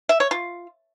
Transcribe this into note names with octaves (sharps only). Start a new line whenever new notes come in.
E5
C#5
F4